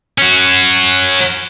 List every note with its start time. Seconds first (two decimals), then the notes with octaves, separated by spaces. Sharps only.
0.18 C#4 F#4